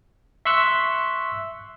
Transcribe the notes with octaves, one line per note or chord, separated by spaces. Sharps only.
E5 C6 C#6 E6 F#6